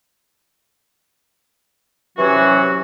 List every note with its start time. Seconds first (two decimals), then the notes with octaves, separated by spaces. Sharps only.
2.17 C3 E3 F#3 C#4 F#4